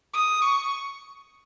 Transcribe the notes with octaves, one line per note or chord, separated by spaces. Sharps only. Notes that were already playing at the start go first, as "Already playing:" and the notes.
D#6
C#6